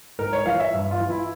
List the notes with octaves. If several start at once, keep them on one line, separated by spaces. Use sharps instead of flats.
G#2 A#4
C#5
E3 F5
E5
G2
F4
E3
E4